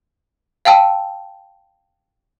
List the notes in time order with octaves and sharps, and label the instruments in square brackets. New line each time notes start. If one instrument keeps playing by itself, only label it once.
[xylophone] F5 G5 A5 E6